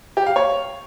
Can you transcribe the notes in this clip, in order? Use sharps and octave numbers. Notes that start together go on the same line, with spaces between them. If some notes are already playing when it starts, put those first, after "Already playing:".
G4
F5
C#5